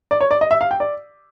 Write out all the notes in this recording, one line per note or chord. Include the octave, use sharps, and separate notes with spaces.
D5
C#5
D5
D#5
E5
F5
G5
D5